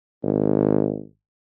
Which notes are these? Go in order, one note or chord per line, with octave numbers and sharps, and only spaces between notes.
G#1